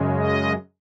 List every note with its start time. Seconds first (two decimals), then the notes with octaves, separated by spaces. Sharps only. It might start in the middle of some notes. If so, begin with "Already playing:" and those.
Already playing: F#2 C#3 G#3
0.17 D#5